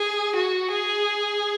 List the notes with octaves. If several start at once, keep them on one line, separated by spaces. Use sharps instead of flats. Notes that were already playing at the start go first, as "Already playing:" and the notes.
Already playing: G#4
F#4
G#4